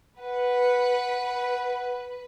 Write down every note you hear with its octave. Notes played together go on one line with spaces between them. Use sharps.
B4 F#5